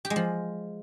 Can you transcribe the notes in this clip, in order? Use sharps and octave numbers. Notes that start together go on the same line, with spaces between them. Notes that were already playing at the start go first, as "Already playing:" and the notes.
G4
G#3
F3